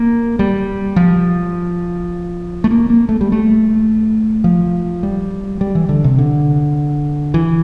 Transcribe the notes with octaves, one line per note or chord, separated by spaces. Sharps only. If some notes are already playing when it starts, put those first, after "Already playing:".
Already playing: A#3
G3
F3
A3
A#3
A#3
A3
G3
A3
F3
G3
G3
E3
D3
C3
D3
E3